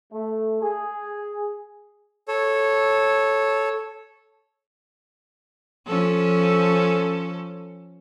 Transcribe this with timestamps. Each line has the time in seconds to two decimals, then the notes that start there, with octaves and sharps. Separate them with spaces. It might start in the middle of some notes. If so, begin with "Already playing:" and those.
0.12 A3
0.62 G#4
2.28 A4 C#5
5.87 F3 C#4 A4